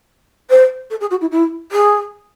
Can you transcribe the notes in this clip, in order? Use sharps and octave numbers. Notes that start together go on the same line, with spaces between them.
C5
A4
G#4
F#4
E4
E4
G#4